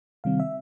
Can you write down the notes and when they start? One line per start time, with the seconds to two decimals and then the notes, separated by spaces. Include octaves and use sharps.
0.24 C3 D#3 G3 C4 F5
0.40 E5